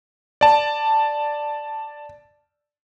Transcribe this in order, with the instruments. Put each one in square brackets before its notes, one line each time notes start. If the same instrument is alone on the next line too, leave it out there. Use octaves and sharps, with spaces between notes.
[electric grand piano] D5 A5